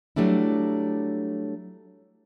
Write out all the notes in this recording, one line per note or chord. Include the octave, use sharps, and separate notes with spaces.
F#3 G3 A3 D4 E4